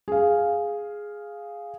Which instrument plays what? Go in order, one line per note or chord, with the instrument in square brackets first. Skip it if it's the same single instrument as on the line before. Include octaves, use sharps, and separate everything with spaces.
[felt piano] G#4 F5